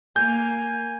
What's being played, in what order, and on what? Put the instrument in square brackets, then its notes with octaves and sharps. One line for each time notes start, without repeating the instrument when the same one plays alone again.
[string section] A#3 [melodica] G#5 [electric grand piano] G6